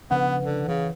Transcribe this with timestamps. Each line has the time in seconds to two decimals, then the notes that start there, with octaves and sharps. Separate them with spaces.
0.11 C#3 F3 B3 D4 B4 F#5
0.45 D3
0.68 C#3 E3